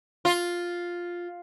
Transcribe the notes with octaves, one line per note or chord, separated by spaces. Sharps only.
F4